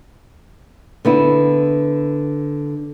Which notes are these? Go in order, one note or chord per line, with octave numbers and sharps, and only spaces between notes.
D3 B3 E4